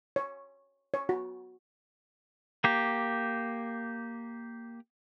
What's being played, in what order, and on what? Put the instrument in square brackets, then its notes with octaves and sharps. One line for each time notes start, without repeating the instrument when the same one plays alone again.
[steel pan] C#5
C#5
F#4
[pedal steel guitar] A#3 G4